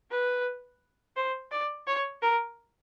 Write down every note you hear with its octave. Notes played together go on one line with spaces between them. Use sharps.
B4
C5
D5
C#5
A#4